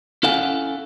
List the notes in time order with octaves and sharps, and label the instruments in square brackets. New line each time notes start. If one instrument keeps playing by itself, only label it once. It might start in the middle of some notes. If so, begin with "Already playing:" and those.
[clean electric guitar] C#4 E4 A4 F5 F#5 G#5